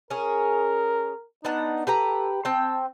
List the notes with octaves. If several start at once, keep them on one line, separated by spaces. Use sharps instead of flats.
C#4 G#4 A#4
B3 D4 D#4 F#5
G4 A4 B4 A#5
C4 G5 A5